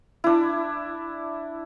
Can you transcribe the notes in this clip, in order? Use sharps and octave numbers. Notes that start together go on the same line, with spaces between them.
D4 E4